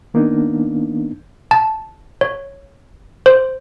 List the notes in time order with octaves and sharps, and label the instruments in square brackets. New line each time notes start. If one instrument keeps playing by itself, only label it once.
[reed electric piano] D#3 A#3 B3 D4 D#4
[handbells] A5
C#5
C5